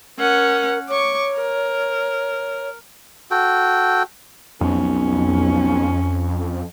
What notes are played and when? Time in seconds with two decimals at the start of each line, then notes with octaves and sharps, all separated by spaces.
0.19 C#4 A#4 F#5
0.89 C#5 C#6 D6
1.36 A#4
3.31 F#4 A4 G5
4.61 B1 F2 C#4